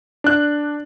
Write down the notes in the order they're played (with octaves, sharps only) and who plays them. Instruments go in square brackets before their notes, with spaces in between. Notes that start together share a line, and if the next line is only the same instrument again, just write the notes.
[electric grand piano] D4 F#6